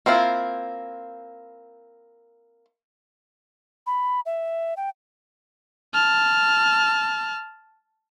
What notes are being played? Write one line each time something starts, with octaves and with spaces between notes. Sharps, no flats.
A#3 C4 E4 F4
B5
E5
G5
A5 F6